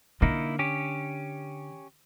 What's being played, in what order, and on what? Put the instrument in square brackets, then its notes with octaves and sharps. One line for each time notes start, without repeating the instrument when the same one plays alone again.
[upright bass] D3 [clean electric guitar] A#3 D#4 E4
[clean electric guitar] C#4 G4